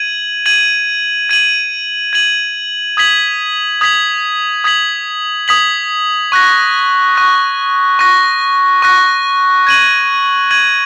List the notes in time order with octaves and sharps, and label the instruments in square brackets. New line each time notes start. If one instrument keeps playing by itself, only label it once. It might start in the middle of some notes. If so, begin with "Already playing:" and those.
Already playing: [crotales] G#6 D#7 F#7
G#6 D#7 F#7
G#6 D#7 F#7
G#6 D#7 F#7
D#6 G#6 B6 F#7
D#6 G#6 B6 F#7
D#6 G#6 B6 F#7
D#6 G#6 B6 F#7
C#6 F#6 A#6
C#6 F#6 A#6
C#6 F#6 A#6
C#6 F#6 A#6
G#6 D#7 F#7
G#6 D#7 F#7